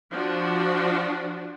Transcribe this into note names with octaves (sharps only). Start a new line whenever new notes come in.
F3 D4 F#4